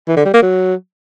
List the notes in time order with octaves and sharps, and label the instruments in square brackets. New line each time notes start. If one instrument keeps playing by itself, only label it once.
[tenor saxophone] E3
D3
G3
A#3
F#3